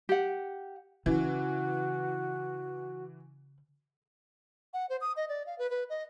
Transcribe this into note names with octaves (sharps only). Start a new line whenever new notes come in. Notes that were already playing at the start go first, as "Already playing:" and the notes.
G4 F#5
C#3 E3 F#4
F#5
C5
D#6
D#5
D5
F5
B4
B4
D#5